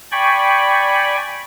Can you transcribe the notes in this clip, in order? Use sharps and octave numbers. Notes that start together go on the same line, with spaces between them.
D5 G5 G#5 B5 C#6